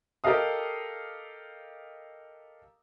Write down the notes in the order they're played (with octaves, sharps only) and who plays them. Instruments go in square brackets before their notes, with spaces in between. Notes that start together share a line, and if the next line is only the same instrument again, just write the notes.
[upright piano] G4 A4 A#4 D#5 F5 D#6